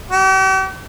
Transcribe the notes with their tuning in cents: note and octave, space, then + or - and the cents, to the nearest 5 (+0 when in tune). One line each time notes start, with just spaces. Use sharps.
G4 -45